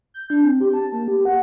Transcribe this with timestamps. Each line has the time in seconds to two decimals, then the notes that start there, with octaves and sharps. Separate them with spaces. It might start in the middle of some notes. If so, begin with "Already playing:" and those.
0.14 G6
0.30 D4
0.44 C4
0.61 G4
0.74 A5
0.92 A#3
1.08 G4
1.25 F#5